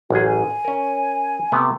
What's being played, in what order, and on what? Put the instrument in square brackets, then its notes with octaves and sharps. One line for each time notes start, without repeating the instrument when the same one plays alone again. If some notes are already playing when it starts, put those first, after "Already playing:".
[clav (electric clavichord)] A1 F#2 G#4 [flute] F#4
[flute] G#5
[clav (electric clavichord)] C#4 A#4
C3 A3 B3